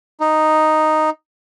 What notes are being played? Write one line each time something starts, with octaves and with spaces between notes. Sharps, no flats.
D#4